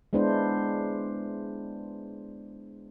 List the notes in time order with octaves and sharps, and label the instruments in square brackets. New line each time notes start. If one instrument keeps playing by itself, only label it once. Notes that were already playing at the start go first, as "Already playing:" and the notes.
[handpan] G#3 B3 D4 E4 C5